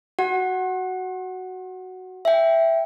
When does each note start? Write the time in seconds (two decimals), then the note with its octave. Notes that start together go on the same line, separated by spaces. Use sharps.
0.19 F#4 F#5
2.25 E5 G5